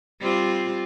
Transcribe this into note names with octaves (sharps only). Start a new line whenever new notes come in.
G3 C4 F4